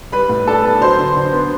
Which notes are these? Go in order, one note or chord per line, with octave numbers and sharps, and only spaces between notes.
G3 B4 B5
A2
D4 A4 A5
B3
F#3 C5 C6
D3
D3
B3